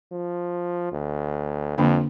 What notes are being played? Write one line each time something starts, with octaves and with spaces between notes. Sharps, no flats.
F3
D2
F2 D3 A#3 D4